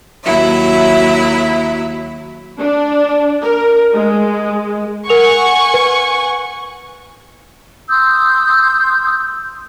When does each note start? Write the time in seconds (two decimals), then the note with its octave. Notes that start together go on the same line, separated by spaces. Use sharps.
0.23 D#2 F#3 E4 E5
2.59 D4
3.44 A#4
3.94 G#3
5.10 A#4 F#5 G#5 C#6 F7
5.74 B4
7.89 C6 D#6 E6 G6